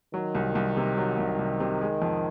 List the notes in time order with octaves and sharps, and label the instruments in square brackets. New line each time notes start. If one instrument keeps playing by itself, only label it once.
[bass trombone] D#3 [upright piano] F#3
[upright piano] C2
C2
C3
F#3
C2
C2
C3
G#3
F2